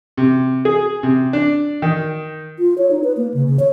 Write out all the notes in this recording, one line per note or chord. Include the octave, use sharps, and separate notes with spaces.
C3
G#4
C3
D4
D#3
F4
C#5
D#4
B4
A#3
C#3
C#3
C#5